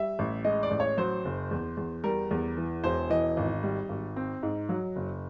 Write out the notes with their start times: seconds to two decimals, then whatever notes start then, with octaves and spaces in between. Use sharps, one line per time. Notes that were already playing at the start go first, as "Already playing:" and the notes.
Already playing: G3 E5
0.19 A1
0.45 G#3 D#5
0.63 D5
0.71 A1
0.80 C#5
0.97 F#3 C5
1.25 F#1
1.51 E2
1.77 E2
2.04 G3 A#4
2.31 E2
2.57 E3
2.84 E1 C5
3.10 E3 D#5
3.37 G#1
3.63 G3
3.89 G#1
4.17 C4
4.43 G#2
4.69 F#3
4.96 F#1